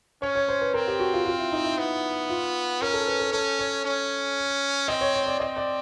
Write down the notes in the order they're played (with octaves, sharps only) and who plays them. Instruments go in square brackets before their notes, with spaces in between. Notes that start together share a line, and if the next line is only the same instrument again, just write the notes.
[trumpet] C#4 [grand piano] C#5
[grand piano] C#5
C5
B4
[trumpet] C4 [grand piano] A#4
[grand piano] G4
F#4
F4
F4
E4
D#4
E4
[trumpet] B3
[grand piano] F4
[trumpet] C#4 [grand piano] A#4
[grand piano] A4
B4
A4
[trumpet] C#4 [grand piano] A4
[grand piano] C#5
[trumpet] C#4
[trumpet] C4 [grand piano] D#5
[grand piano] C#5
C#5
D5
[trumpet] C4 [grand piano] D#5
[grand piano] D5